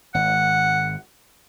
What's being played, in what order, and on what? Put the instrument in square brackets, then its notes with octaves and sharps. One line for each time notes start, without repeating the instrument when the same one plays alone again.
[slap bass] G#1 [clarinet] F#5